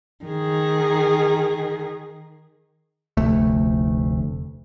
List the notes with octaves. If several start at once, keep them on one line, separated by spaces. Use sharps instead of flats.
D#3 G#4
F1 D2 A3